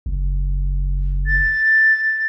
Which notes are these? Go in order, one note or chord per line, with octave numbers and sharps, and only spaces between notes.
F#1
A6